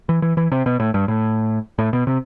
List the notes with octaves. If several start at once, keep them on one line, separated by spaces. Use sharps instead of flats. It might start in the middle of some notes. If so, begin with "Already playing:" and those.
E3
E3
E3
C3
B2
A2
G2
A2
A2
B2
C3